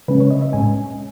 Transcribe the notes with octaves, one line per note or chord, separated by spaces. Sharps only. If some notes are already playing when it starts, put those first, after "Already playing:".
C#3 G#3 C#4 B4
C#5
D#5
E5
A2 G#3 C#4 G#5